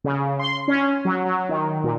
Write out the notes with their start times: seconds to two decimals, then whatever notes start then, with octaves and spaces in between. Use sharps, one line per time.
0.04 C#3
0.39 C6
0.68 C#4
1.05 F#3
1.25 F#3
1.49 D#3
1.84 A#2